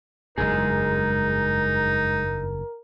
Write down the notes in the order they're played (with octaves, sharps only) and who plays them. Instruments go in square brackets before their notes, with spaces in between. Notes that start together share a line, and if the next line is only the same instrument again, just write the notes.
[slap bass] F#1 E2 G2 [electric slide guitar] G#3 G#4 [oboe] D#4 [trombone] A#4